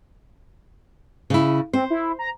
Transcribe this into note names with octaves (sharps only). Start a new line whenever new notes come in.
C#3 E4
C4 C5
E4
A#5